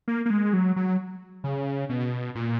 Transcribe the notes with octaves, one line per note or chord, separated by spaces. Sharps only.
A#3
A#3
G#3
F#3
F#3
C#3
B2
A#2